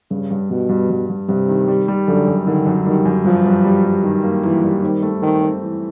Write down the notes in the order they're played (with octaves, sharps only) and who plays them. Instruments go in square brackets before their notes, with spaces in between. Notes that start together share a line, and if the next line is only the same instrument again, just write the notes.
[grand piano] G2 [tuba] C#3
[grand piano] G2
[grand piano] G2 [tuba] B2
[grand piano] G2
G2
G2
[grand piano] G2 [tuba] C3
[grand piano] D#3
G3
G3
[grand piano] F#2 [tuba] D3
[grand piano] F#2
[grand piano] D3 [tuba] D#3
[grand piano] F#2
[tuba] D#3 [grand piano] G3
[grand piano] F#2
[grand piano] G2 [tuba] F3
[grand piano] G2
G3
G3
D#3
A#3
[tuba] E3 [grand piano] A#3
[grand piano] G3
[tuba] D#3 [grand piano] C4
[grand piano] A3
[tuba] D#3 [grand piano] C4
[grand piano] C4
E3